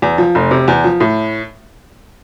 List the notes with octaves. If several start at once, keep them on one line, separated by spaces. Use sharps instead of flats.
E2
F3
F1
C3
E2
F3
A2